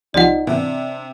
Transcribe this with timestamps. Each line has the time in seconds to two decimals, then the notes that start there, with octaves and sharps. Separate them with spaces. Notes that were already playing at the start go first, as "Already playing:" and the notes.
0.14 C2 C3 F3 D#4 D5 F#5
0.47 C3 E3 D4